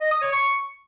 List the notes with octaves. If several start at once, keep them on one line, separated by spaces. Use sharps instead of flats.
D#5
D#6
C#5
C#6